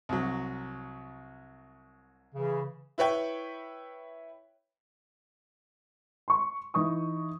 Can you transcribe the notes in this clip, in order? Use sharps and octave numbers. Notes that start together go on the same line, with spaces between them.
C2 F#3
C#3 E3
E4 B4 C#5 G5
C6 C#6
E3 D#4 C#6 D#6